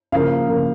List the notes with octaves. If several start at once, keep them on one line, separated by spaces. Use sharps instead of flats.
C#3 F3 A#3 F5
C#3 F3 A#3